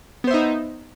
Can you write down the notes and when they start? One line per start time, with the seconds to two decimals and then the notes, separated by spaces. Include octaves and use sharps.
0.24 B3
0.27 C5
0.31 E5
0.34 D#4